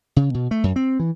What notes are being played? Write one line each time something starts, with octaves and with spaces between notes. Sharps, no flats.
C#3
B2
A3
F#2
C4
E3